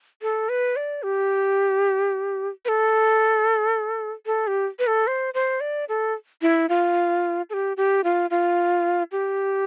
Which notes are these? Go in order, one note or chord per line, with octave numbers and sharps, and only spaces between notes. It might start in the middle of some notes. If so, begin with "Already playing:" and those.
A4
B4
D5
G4
B4
A4
A4
G4
B4
A4
C5
C5
D5
A4
E4
F4
A4
G4
G4
F4
F4
G4